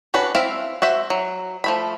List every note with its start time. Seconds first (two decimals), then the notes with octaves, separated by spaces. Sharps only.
0.14 C#4 D4 F#4 B4
0.35 C4 E4 E5 F5
0.82 F#4 C5 E5
1.10 F#3
1.64 F3 A3 B5